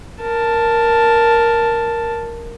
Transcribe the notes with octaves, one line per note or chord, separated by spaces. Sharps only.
A#4 A5